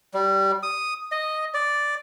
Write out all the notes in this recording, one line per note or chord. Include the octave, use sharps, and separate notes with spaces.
G3
D#6
D#5
D5